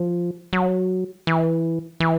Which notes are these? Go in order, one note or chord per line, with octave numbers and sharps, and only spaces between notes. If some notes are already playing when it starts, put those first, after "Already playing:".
Already playing: F3
F#3
E3
E3